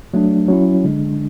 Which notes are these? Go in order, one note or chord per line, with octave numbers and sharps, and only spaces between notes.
F#3 A3 D4
F#3 C#4 E4
D3 G#3 D4